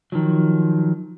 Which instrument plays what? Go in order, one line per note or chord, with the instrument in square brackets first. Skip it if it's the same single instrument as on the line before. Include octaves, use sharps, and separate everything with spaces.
[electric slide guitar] D#3 F3 F#3